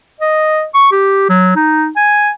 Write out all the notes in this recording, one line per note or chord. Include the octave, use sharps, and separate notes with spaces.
D#5
C#6
G4
F#3
D#4
G#5